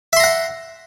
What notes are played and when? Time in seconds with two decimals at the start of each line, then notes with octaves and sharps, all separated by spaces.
0.13 E5
0.17 C6
0.20 A#5
0.24 F#5